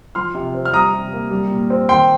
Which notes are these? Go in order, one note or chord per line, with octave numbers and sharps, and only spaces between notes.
F3 C6 F6
C3
C4
F6
G3 A#5 D#6
C3
A#3
G3
A#2
C4
D#3 G5 C6